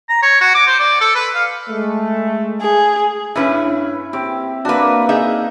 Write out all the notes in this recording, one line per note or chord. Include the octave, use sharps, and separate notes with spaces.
A#5
C#5
F#4
D6
C5
D5
A4
B4
F5
G#3 A3
G#4
G2 C#4 E4 B4
C4 G4
A#3 D4 F#4 B4
D#4 G#4 E5